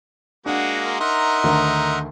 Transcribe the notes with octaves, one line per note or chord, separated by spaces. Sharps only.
G#3 A#3 D4 F#4 F#5
A#4 C6
D#4 A#4 E5 F#5 A#5 C6
D2 D3 D#3